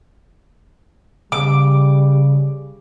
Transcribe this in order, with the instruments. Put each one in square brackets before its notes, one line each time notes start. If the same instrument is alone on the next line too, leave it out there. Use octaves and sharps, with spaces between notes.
[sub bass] C#3 [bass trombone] G3 [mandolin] D6